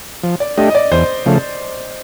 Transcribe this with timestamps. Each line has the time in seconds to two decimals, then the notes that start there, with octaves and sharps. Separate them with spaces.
0.23 F3
0.40 D5
0.57 A3 D4 G4 D#5
0.70 D#5
0.75 D5
0.92 E2 C5
1.26 C#3 F3 A3